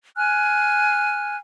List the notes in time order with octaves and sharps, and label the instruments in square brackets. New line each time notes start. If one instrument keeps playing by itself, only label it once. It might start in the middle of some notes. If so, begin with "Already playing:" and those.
[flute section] G#5 F6 F#6